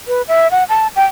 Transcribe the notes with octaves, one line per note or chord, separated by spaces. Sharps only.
B4
E5
F#5
A5
G5